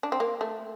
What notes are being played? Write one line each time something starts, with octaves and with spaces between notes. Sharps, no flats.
D4
C4
A#3
A3